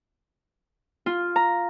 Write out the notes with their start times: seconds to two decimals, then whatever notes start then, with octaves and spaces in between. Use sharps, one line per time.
1.06 F4
1.36 A#5